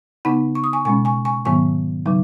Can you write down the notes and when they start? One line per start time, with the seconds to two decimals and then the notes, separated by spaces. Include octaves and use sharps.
0.25 C#3 B3 D#4 F#5 B5
0.55 C#6
0.64 D#6
0.73 G#5 C#6
0.85 B2 G#3 C#4 G#5 C#6
1.05 G#5 C#6
1.25 G#5 C#6
1.45 G#2 D#3 F#3 B3 G#5 C#6
2.06 C#3 F#3 D#4